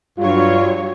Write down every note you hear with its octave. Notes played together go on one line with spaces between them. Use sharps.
G2 F#3 G3 F4 C#5